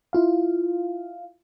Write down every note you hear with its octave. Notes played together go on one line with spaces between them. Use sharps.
E4 F4 F5